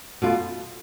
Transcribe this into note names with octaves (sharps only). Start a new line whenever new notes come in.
B2 A3 F4